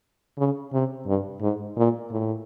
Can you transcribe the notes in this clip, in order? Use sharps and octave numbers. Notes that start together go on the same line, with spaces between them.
C#3
C3
G2
G#2
A#2
A2